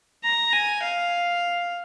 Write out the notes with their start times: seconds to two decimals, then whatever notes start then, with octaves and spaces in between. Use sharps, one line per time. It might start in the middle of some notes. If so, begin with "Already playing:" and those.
0.24 A#5
0.53 G#5
0.82 F5